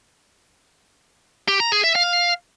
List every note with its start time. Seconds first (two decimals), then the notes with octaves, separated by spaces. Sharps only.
1.48 G4
1.60 A#5
1.72 G#4
1.84 E5
1.95 F5